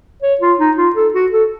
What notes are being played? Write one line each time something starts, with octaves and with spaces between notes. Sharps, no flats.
C#5
F4
D#4
F4
A4
F#4
A4